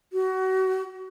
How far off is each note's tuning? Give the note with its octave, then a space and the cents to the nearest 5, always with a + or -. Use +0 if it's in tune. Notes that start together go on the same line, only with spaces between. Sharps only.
F#4 +30